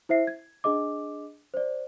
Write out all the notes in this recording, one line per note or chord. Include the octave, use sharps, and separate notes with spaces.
E4 C5 E5 C7
G#6
D4 G#4 D#5 D6
C5 D5